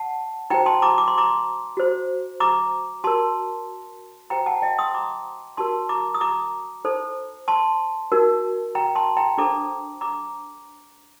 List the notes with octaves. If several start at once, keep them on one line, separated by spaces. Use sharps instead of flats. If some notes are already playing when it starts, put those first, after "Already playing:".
Already playing: F#5 A5
D#4 F#4 C5 G5 A#5
A5 C6
A#5 D6
D6
C6
A#5 D6
F#4 C5
A#5 D6
F#4 A#4 A5 C6
F#4 C5 G5 A#5
F#5 A5
D#5 G5
C6 D#6
A#5 D6
D#4 F#4 A#4 A5 C6
A#5 D6
D#6
A#5 D6
D#4 A4 C5
A5 C6
D#4 F#4 A#4
G5 A#5
A5 C6
G5 A#5
D4 A4 C5 A#5 D6
A#5 D6